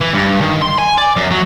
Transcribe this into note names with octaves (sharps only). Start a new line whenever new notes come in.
E3
G2
D#3
C6
G#5
D5
F#2
F#3